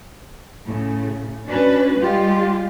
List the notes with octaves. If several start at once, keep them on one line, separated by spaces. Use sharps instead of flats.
A2 C#3
C#4 D4 F#4 B4
G3 G#3 F4 G4